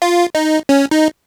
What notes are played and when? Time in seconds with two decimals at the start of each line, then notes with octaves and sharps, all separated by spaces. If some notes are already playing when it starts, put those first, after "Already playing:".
0.02 F4
0.35 D#4
0.69 C#4
0.91 D#4